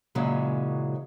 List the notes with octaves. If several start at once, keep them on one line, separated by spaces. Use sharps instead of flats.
F#2 A#2 C#3 E3 F#3 G#3